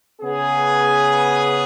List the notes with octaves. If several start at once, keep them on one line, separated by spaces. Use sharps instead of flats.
C#3 B3 G#4